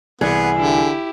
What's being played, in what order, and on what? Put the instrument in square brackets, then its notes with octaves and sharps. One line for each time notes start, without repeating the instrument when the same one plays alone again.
[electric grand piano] C2 E3 D5 [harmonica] B3 F#5 [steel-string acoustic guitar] G#4
[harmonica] D3 [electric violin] E4 G4